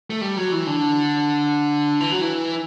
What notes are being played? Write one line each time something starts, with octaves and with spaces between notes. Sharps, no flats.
A3
G3
F#3
E3
D3
E3
F#3
E3